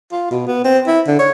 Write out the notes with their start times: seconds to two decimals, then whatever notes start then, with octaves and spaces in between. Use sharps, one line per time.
0.12 F4
0.31 B2
0.47 B3
0.65 C4
0.87 E4
1.07 D3
1.19 C#5